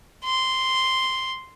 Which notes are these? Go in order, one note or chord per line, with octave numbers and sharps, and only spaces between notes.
C6